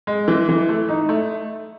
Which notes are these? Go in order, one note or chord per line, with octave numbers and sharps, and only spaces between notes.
G#3
E3
E3
A3
D#4
A3